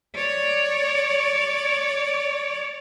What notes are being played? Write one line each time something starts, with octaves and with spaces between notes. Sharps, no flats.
C#5 D5